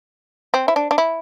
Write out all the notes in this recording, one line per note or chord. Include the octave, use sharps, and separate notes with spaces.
C4
E4
D4
D4
E4